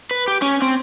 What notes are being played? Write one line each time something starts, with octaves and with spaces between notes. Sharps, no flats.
B4
G4
C#4
C4